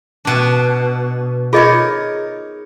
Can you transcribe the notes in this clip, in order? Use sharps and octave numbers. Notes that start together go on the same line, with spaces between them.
B2 D4
D#4 F4 G#4 A#4 C#5 D#5